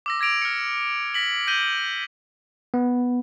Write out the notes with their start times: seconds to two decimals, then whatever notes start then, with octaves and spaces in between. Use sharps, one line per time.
0.06 D6 E6 A#6
0.20 D6 G#6 A#6 D7 F7
0.42 F6 C#7
1.14 A#6 B6 F#7
1.47 G6 A#6 D#7 F#7 G7
2.74 B3